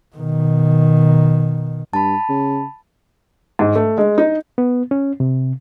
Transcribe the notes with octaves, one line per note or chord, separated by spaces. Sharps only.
B2 D#3
G2 A5 B5
C#3
G#2
A3
G#3
D#4
B3
C#4
C3